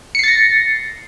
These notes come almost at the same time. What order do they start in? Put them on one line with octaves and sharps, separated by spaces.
C#7 C7 A6 A#6